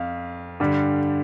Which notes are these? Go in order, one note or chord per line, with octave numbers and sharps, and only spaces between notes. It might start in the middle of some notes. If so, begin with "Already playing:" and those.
Already playing: F2 F5
G2 D3 G3